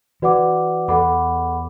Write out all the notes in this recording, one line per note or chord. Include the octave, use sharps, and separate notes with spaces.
E3 F#4 B4 D5 F#5 D6
E2 A4 F#5 B5 D6